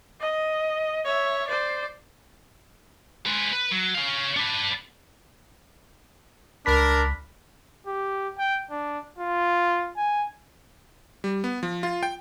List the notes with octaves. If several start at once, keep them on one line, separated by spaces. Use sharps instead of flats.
D#5
C#5 E5
C5 D5
G#3 B4
B4
F#3
C#4 F5
D4 B4
C#2 D4 A#4 B5 B6
G4
G5
D4
F4
G#5
G3
B3
F3
F4
G5